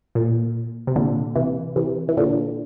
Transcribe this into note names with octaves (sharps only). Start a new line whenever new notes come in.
A#2
C3
A#2 D3
C3 E3
C3 E3
E3
A#2 D3